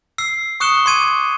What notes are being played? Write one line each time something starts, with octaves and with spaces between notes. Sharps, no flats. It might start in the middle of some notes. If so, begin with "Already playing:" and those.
E6 C7
C#6 D#6 F#6 C#7 E7 G7
C6 D6 G#6 D#7